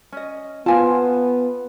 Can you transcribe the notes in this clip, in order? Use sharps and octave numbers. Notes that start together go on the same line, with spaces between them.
C#4 D#5
B3 F4 G#5 A5